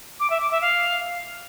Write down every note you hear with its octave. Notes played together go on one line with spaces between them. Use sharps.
D6
E5
D6
E5
F5